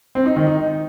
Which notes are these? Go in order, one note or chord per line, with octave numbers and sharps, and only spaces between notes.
C4
D#4
D#3
D#4